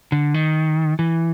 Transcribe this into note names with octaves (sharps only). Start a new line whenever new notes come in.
D3
D#3
E3